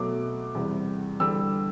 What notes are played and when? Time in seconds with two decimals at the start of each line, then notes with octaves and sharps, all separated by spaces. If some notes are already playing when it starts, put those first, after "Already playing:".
Already playing: B2 F#3 A3 D6
0.55 E2 C3 G3
1.19 E2 D3 G3 E6